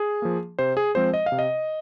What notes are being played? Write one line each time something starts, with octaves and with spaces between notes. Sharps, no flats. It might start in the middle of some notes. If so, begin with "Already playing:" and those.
Already playing: G#4
F3 A#3
C3 C5
G#4
F3 G#3 C4 C5
D#5
F5
C3
D#5